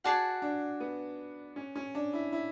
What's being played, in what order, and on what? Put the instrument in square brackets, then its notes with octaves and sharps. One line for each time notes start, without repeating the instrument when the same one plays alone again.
[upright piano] F#4 [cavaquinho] G#4 D5 F#5 A5
[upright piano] D4
B3
C#4
C#4
D4
E4
E4